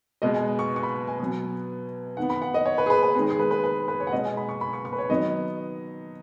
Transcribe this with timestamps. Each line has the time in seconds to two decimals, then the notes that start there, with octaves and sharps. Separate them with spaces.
0.22 B2 G#3 B3 D#5
0.34 G#5
0.59 C#6
0.76 C#6
0.83 B5
1.07 G#5
1.20 B2 F#3 B3
2.17 D#3 B3 F#5
2.30 B5
2.42 F#5
2.54 D#5
2.66 C#5
2.78 B4
2.86 G#4
2.90 B4
3.03 B4
3.14 D#3 G#3 B3 G#4
3.30 G#4
3.39 B4
3.51 B4
3.64 B4
3.88 B4
4.00 C#5
4.07 F#5
4.12 B2 G#3 B3 D#5
4.25 G#5
4.37 B5
4.49 C#6
4.61 B5
4.73 C#6
4.85 C#6
4.93 B4
4.98 C#5
5.09 D#3 F#3 B3 D#5